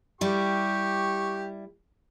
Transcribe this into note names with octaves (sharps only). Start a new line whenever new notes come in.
G3 E4 G4 C#6